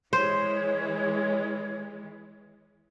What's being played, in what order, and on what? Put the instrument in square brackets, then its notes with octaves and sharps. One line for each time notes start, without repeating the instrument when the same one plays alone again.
[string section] E3 G#3 [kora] C5 [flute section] C#5